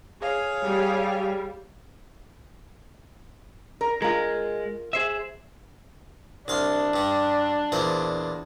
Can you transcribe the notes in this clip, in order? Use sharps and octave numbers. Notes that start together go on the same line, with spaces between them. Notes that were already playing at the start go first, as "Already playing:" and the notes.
G#4 C#5 F5
G3
A#4
G#3 F4 A#4
G#4 C5 E5
C2 D4 F5 C6
G2 G3
E2 A#2 C5